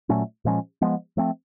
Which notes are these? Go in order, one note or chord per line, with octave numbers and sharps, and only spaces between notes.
A#2 F#3 A3 C#4
A#2 F3 G#3 C#4
F3 G#3 B3
F3 A3 C4